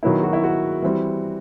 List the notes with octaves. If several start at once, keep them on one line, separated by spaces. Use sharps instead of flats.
D#3 F#3 B3 E4
F#4
E4
F#4
E3 G3 C4